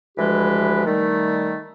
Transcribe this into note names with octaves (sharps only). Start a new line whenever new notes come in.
D2 E3 F3 G#3 G4 B4
D#3 G3 A3